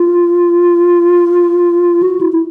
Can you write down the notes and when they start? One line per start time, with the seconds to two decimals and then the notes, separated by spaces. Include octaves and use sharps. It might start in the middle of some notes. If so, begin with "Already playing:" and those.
Already playing: F4
2.02 F#4
2.21 E4
2.32 E4